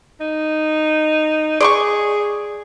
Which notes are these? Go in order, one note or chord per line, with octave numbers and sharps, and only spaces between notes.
D#4
G#4 D5 C6 C#6